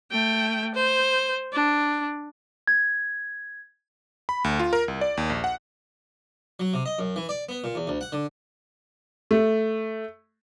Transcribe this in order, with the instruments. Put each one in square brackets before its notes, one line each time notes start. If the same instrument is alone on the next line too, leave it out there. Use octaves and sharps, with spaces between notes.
[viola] A3 G5
C5
D4
[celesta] G#6
[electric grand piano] B5
D2
F4
A#4
C2
D5
D#2
A#1
F#5
[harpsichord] F#3
C3
D#5
F#2
E3
D5
B3
A#2
E2
D2
F#5
D3
[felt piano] A3